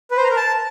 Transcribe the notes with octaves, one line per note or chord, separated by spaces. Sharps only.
B4
C5
A#5
A#4
A5